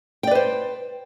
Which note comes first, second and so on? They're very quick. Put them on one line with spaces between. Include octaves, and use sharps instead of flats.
G5 D5 B4 C5